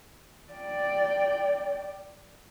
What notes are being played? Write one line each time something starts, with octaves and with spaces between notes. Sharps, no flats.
D5 G5